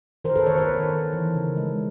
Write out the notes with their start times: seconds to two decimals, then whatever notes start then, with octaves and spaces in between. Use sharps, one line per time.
0.24 D#3 A#4 C5
0.36 A4 B4
0.46 D#3 B4 C#5
0.58 B4 C#5
0.69 D#3
0.91 D#3
1.13 E3
1.34 C#3
1.57 G#3